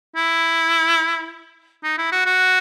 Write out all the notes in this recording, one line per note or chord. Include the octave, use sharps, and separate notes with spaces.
E4
D#4
E4
F#4
F#4